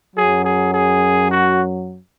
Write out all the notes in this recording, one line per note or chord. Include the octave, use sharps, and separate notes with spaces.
F#2 F#3 G#4
G#4
G#4
F#4